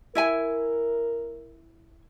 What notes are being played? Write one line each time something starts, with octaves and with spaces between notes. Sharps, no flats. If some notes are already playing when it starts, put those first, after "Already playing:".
E4 A#4 E5 G#5